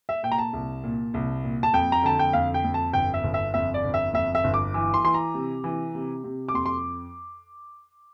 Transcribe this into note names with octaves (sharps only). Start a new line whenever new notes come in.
E5
A#2 G5
A#5
A5
C2
A#2
C2
A#2
A5
F2 G5
A#5
D3 A5
G5
F2 F5
G5
F2
A5
G1 G5
E5
G1
E5
F2 E5
D5
G1
E5
F2 E5
E5
G1
D6
E3
C6
E3 C6
A#5
C3
E3
C3
C3
D6
F2 C6
C6